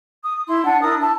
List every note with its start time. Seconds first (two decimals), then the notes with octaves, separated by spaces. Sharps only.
0.22 D#6
0.46 E4 C6
0.64 D4 F#5 A5
0.82 D4 E4 A#4 D#6
0.99 E4 A5